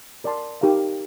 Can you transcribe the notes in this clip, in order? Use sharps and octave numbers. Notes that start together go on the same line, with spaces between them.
A#4 D5 A5 C6
D#4 G4 A#4 F5